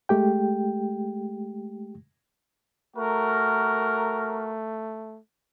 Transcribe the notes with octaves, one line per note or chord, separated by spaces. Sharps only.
G#3 A3 G4 G5
A3 F#4 A#4